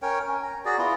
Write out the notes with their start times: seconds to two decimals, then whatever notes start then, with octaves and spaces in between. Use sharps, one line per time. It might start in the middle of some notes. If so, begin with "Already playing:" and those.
0.02 C#4 A#4 C#5 G5
0.28 C#4
0.43 A#5
0.65 F#4 G#4 D5
0.78 B3 E4 F4